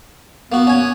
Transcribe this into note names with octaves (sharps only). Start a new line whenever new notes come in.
A#3 B3 F#4
C#4 G#5